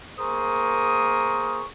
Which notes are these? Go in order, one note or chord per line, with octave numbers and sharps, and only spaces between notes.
A#3 G#4 A#4 C5 C#6 D#6